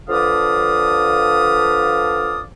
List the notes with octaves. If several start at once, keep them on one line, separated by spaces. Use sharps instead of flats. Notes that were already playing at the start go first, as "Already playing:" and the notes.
D3 F3 B4 D5 F5 D#6